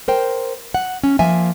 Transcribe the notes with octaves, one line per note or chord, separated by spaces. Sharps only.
A#4 C5 G5
F#5
C#4
F3 A#3 E5 G#5